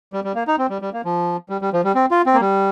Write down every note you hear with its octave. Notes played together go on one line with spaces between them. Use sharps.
G3
G3
A#3
D#4
C4
G3
G3
A#3
F3
G3
G3
F3
G3
C4
F4
C4
A#3
G3